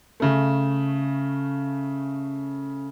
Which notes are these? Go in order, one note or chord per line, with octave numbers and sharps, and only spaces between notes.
C#3 A3